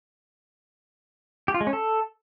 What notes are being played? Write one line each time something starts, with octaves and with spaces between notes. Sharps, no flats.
G4
F4
G#3
C#4
A4